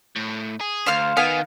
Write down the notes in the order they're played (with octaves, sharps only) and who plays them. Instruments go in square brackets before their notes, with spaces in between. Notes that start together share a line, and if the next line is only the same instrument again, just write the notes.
[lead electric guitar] A2
G#4
[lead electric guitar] D2 [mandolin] C5 F5 F6
[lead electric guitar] D#3 [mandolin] B3 F5 G#5